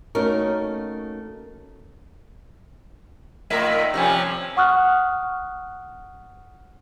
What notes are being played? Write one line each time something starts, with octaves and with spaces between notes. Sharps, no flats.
A3 A#3 C#4 D#4 F#4 A#4
A#2 D#3 A3 A#4 E5
C3 F3 G3 C4 C#4
F#5 C#6 D#6 F6 F#6